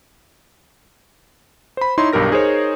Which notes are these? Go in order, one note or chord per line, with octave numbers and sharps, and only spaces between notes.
C5 B5
D#4 E4 C#5 C6
B1 G2 G4 A#4 A#6
D#4 G#4 A#4 C5 C#5